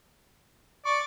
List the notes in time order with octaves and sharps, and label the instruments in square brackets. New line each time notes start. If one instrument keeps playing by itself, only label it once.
[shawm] D5 [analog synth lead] C#6